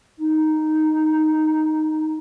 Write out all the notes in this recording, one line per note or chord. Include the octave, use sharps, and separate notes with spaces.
D#4